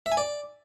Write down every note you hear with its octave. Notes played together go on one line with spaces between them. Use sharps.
E5
G#5
D5